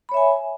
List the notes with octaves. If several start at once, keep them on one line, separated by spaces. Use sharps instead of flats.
C#5 E5 G#5 B5